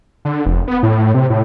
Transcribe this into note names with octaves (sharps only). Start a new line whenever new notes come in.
D3
F1
B3
A2
C3
A2